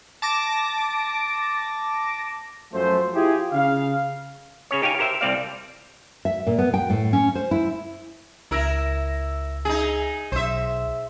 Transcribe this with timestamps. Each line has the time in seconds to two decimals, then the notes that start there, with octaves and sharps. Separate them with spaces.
0.22 A5 D6 A#6
2.73 F#2 F3 A3 C5
3.14 E4 F4 G4 G#4
3.51 C#3 F5
4.71 C#3 C#4 C#5
4.82 D#4 G4 C#5 F5 G#5
4.99 G4 A#4 C5 E5
5.21 C2 G3 C4 D5 F5
6.25 E5
6.47 A#2
6.58 B3
6.74 G5
6.90 A2
7.13 C#4
7.35 C5
7.51 E4
8.51 C#2 E4 A#4 E6 A#6
9.65 D#4 G#4
10.32 B1 C5 E5